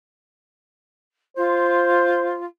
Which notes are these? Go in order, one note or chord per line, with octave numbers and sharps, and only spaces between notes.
F4 C5